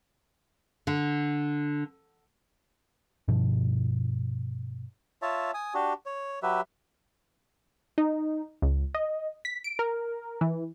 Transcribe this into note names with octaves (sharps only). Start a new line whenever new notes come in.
D3
G2 B2 F3
F4 C#5 E5 A5
G#5 D#6
D4 F#4 G4
C#5
F#3 G4 B4 E5
D#4
C#2
D#5
B6
D7
A#4
E3